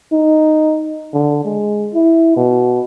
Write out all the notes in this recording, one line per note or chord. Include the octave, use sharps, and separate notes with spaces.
D#4
D3
G#3
E4
B2